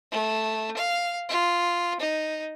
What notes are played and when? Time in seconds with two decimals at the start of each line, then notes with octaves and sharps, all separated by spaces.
0.12 A3
0.77 F5
1.29 F4
2.00 D#4